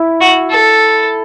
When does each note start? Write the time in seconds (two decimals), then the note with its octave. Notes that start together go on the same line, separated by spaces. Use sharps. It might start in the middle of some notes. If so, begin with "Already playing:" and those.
Already playing: E4
0.21 F#4
0.51 A4